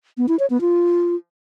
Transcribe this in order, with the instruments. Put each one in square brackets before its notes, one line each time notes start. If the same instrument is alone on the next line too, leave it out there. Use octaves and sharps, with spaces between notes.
[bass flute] B3
E4
C#5
B3
F4